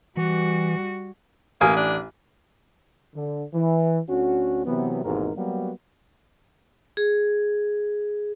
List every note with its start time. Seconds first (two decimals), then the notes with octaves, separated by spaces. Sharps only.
0.17 E3 G3 F#4
1.61 A1 A#3 G#5 D#6
1.76 D4
3.15 D3
3.54 E3
4.09 D2 D3 C#4 F#4
4.66 C3 E3 F#3 B3
5.05 G#1 D#2 G#2 B2 E3 A#4
5.37 F#3 G3 A#3 B3 F#4
6.97 G#4